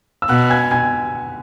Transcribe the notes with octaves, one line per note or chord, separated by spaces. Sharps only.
E6
B2 F#5 F#6
G#5 G#6
G#5 G#6